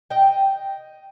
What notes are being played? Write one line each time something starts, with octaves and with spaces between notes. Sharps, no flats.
D#5 G5